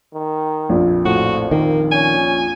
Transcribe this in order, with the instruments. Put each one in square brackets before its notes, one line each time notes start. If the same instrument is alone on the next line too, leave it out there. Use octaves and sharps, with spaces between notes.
[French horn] D#3
[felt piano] A#1 F2 A#2
[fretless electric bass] A2 [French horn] F3 [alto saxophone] F#4
[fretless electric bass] D#3 [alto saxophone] A#3
[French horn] C#4 [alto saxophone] G#5